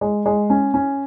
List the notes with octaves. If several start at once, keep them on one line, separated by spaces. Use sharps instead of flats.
G#3
G#3
C#4
C#4